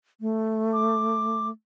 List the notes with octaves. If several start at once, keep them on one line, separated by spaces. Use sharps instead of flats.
A3
D6